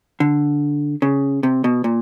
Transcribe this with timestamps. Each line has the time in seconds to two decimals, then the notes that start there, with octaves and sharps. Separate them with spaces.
0.20 D3
1.02 C#3
1.43 C3
1.64 B2
1.84 A#2